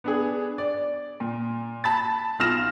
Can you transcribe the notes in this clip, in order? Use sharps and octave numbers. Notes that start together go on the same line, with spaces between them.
B3 D4 G#4
D5
A#2
A5 B5 A6
B1 F4 F6 A#6 E7